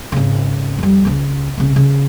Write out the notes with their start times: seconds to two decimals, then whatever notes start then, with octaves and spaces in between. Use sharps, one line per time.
0.12 G#1 C#3
0.79 F2 G3
1.05 C#2 C#3
1.58 C2 C#3
1.76 C#3